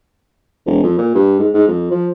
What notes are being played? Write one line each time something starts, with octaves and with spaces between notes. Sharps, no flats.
E1
F2
A#2
G2
G#2
G#2
F2
F3